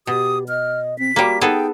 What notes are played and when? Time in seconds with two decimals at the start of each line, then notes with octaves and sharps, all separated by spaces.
0.07 B2 G4 D#6
0.48 D#5 F6
0.99 C4 B6
1.16 G3 A#3 F#4
1.41 B3 D#4 G#4 A4 G5